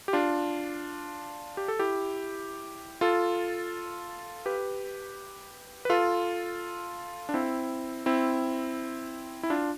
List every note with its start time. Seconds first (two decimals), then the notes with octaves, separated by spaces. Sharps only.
0.08 G4
0.13 D4 F4
1.57 G4
1.68 A4
1.79 E4 G4
3.01 F4 A4
4.46 G4 B4
5.85 B4
5.90 F4 A4
7.29 D4
7.34 C4 E4
8.06 C4 E4
9.43 E4
9.50 D4 F4